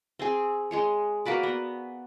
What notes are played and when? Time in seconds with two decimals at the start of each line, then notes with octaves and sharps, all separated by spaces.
0.19 C4 G#4
0.71 G#3 G#4 C#5
1.26 A#3 F#4 B4 D5
1.43 B3